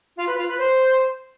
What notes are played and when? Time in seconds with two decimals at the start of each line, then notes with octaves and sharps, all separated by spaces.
0.17 F4
0.28 B4
0.38 F4
0.48 B4
0.59 C5